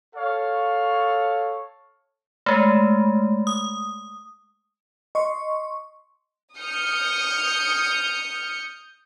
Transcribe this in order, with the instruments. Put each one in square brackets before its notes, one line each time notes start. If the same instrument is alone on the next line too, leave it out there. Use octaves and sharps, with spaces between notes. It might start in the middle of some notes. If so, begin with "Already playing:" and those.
[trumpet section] A4 C#5 F5
[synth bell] G#3 A3
D#6
[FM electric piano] D#5 C6 C#6
[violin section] D#6 F6 G6 C#7